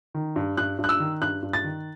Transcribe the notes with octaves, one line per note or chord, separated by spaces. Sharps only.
D#3
G2
G2 F#6
G2
F#6
E6
D#3
G2 F#6
G2
A6
D#3